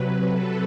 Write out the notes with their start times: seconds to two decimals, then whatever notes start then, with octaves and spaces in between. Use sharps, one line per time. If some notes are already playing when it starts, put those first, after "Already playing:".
Already playing: C3 F#3 B4
0.30 A4